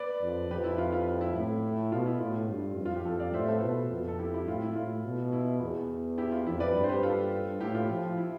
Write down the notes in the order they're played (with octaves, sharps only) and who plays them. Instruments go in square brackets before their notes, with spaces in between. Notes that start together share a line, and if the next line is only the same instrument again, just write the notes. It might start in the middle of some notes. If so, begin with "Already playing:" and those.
Already playing: [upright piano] B4 D5
[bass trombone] F2
[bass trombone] F2 [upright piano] G4 B4
[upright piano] E4
F4
F4
E4
[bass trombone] A2
[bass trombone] B2 [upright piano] F4
[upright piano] E4
[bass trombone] A2 [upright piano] F4
[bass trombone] G2
F2
[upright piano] F4
G4
[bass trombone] F2 [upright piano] F4 A4
[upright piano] D5 F5
[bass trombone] A2 [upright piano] C5 E5
[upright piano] A4 C5
B4
[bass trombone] B2 [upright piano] F4 A4
[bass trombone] F2
[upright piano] A4
E4 G4
E4 G4
[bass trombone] A2 [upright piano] F4
[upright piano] E4
[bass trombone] A2 [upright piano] F4
[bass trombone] B2
[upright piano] E4
[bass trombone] E2
[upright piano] E4 G4
F4
[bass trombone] F2 [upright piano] E4
[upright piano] B4 D5
[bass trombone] G2
[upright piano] C5
G4 B4
F4 A4
[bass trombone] A2 [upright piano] E4 G4
[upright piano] F4
[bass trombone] F3
[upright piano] E4